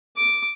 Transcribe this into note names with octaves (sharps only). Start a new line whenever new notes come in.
D6